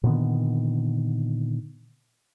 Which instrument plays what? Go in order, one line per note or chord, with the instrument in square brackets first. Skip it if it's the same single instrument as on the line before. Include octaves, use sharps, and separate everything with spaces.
[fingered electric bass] A#2 D3 D#3 B3